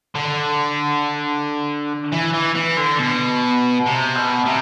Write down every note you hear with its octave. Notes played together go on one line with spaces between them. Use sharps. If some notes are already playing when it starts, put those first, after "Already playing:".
D3
E3
E3
E3
D3
B2
C3
B2
C3